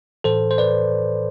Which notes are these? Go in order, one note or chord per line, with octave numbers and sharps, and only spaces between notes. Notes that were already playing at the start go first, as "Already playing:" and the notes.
A2 E3 A4 C5
C5
B4 D5